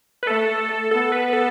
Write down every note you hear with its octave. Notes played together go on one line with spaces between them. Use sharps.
B4
A3 A4
B3 A4
B4
A4